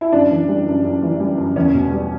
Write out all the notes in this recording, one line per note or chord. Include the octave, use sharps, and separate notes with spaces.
E4
F#2 D4
E3
G3
F#2
F#2
E3
G3
F#2
E2 C#4
B2
G3